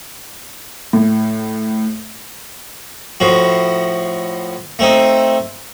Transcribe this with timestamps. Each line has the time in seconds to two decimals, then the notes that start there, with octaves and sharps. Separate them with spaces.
0.93 A2
3.20 A2 F3 F#4
4.79 A3 C4 D#4